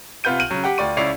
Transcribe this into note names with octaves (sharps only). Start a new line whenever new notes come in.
C3 F4 B4 F#5 G6 D#7
F6 D#7 F#7
C#3 F#3
G4 F#5 G5
D2 F4 D5 G5 C#6 D#7
C#2 C#4 E4 D5 C7 F7